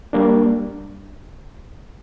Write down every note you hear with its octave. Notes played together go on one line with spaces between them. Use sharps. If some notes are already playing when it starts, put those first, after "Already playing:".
G3 A#3 D4